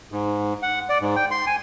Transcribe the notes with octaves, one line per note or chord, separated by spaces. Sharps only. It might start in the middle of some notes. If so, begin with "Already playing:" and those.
G#2
F#5
D5
G#2
G5
C6
G#5